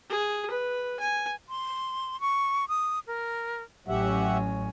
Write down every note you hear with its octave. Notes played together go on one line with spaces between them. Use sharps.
G#4
B4
G#5
C6
C#6
D#6
A#4
A1 F#3 C#4 G4 E5 F#5